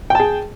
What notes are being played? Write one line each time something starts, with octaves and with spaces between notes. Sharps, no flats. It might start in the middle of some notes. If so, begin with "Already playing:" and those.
G#4 G5 A5